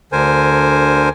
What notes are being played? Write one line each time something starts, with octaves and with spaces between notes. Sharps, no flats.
D2 D3 A#4 C5 G#5